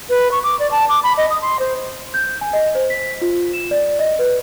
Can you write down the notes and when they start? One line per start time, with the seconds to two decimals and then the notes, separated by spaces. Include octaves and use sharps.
0.10 B4
0.31 C#6
0.43 D6
0.59 D5
0.71 A5
0.89 D6
1.03 B5
1.17 D#5
1.30 D#6
1.42 C6
1.59 C5
2.14 G6
2.41 G#5
2.53 D#5
2.75 C5
2.90 B6
3.21 F4
3.53 E7
3.71 D5
3.99 D#5
4.19 B4